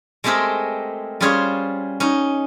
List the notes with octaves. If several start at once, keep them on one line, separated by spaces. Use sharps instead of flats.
G#3 A3 C4 G4 G#4 A#4
G3 C#4 F4 G#4 C5 C#5
C#4 D#4